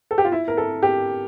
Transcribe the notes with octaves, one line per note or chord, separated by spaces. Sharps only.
A4
G4
F4
E4
A#4
A4
G4